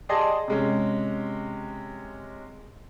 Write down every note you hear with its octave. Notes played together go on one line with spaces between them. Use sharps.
G4 G#4 D5 D#5 A5 C6
C3 G#3 C#4